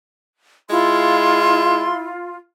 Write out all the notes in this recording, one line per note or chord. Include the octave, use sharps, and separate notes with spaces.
G#3 E4 F4 C6